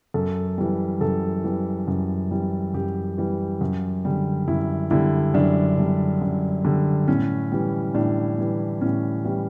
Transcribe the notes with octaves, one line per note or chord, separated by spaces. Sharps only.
F#2 A4
E3 G3
F#2 A4
E3 G3
F#2
E3 G3
F#2 G4
E3 G3
F#2
D3 G3
F#2 E4
D3 G3 E4
F#2 D4
D3 G3
F#2
D3 G3
A2 C#4
E3 G3
A2 D4
E3 G3
A2 C#4
E3 G3